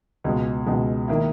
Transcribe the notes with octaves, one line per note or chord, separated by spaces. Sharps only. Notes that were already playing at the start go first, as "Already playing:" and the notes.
C#2 B2 G#3
C#2 B2 G#3
D#3 A#3 E4